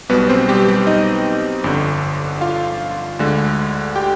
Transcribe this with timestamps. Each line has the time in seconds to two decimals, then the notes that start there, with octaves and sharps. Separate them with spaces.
0.09 B1 B2 G3 B3 B4
0.29 C4 C5
0.49 G3 G4
0.68 G3 G4
0.87 D#4 D#5
1.64 G1 F2 D3
2.41 F4 F5
3.19 D2 D3 G#3
3.95 G4 G5